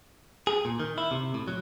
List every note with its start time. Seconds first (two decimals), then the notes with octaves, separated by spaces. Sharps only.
0.47 G#4
0.65 A#2
0.80 D#3
0.98 E4
1.11 C3
1.34 A2
1.48 F#3